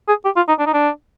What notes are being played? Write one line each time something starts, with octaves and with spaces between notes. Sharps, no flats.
G#4
G4
F4
D#4
D4
D#4
D4